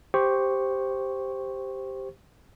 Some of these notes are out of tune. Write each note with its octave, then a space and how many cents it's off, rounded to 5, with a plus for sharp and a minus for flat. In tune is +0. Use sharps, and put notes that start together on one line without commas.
G4 +0 C5 +0 C#6 +0